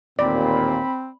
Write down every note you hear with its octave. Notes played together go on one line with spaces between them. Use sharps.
A1 D#2 A#2 C4 D5 B5